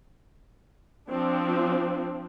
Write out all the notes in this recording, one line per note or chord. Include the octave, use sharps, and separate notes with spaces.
F3 C4 D4